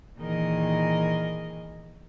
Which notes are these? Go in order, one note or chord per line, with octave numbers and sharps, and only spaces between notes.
A#2 D#3 E3 G#4 A#4 D#5